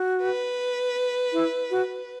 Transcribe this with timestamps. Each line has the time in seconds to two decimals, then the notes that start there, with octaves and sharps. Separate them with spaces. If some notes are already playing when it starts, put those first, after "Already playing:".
Already playing: F#4
0.23 B4
1.33 E4
1.71 F#4